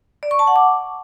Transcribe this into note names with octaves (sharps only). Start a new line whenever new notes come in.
D5
C#6
A5
F#5
D6